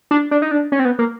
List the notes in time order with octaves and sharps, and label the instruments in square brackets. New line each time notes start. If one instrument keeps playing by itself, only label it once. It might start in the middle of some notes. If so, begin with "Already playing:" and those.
[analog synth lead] D4
D4
D#4
D4
C#4
C4
B3
A#3